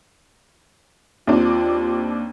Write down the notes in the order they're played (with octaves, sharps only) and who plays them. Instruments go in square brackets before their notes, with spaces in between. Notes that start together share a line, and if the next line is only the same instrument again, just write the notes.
[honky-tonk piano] D#2 C4 D4 [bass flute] F4